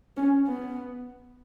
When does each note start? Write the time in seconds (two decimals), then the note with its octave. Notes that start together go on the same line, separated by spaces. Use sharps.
0.17 C#4
0.47 B3